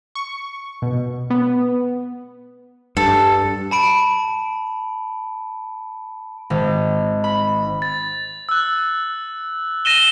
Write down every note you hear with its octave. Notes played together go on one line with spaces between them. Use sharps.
C#6
B2
B3
G2 A4
A5 B5 D7
G#1
B5
A6
E6 F#6
A#6 D#7 E7 G7